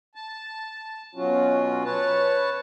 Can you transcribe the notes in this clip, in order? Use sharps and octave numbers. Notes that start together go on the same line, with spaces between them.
A5
B2 F#3 C#4 F4 F#4
B4 C#5 A5